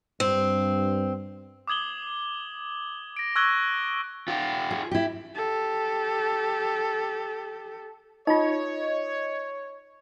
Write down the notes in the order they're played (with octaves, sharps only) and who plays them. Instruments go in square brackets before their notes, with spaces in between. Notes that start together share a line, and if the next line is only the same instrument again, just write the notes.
[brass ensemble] G2 [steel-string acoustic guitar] C4
[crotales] D6 D#6 G#6 F#7 G7
A#6 D7
C#6 E6 F#6 G#6 A#6 G7
[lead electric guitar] F4 G4
[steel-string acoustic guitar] G#4
E4 G4
[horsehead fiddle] G4 A4
[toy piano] D#4 F4 [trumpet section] C#5 [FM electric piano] D#5